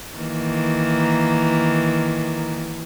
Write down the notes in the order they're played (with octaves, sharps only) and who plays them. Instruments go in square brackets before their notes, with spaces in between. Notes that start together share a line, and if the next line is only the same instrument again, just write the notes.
[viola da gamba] D#3 E3 A#3